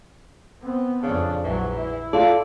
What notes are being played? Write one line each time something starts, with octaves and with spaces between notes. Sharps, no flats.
B3 C4
F2 C#3 D4
A#1 E3 F#3
E4
F4 A4 D5